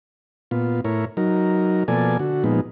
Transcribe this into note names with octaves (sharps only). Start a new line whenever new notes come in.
A#2 B3 F4
A2 E4 A#4 C#5
F#3 D#4 A#4
B2 F3 A#3 A4 D5 G#5
D3 F#4
A#2 F3 G#3 B3 D#4